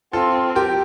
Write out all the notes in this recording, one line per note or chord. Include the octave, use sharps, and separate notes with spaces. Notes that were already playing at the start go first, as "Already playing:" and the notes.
C4 F4 A4
G4 A#4